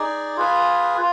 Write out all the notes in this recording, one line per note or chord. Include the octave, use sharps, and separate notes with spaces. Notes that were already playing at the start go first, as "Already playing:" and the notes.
Already playing: D#4 G#4 D5
F4 G#4 B4
F4